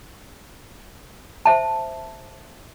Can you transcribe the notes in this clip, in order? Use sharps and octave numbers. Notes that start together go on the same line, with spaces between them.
C5 E5 A5